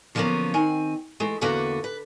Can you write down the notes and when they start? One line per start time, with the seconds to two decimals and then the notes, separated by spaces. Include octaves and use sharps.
0.15 D3 F3 F#3 A#3 B3 C#4
0.54 D#3 C4 G#5
1.20 E3 G#3 A3
1.41 E2 D3 A#3 F#4 B4 F#5
1.84 B4